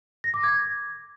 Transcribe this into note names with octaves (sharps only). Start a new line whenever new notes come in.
A#6
D6
G#6